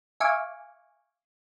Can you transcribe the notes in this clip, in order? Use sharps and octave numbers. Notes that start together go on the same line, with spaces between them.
E5 F5 G#5 C#6 D6